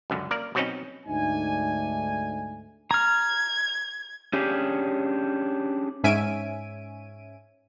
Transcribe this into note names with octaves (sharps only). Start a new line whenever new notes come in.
C#2 F#2 D3
A#3 A#4 D5
B2 F#3 C4 C#4 D#4
D2 G#2 A3 D4 D#4 G#5
A#5 F6 G#6
C#4 D4 G4 G#4
G#2 C#4 E5 G#5 D7 D#7